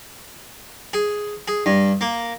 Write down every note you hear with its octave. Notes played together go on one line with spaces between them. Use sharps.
G#4
G#4
G2
A#3